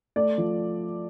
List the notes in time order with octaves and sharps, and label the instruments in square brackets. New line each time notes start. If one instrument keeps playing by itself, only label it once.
[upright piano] A3 D5
F3